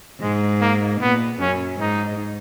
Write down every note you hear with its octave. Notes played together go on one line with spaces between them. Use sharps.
G#2 G#3
A#3
A#2 B3
F#2 C#4
G#2 D#4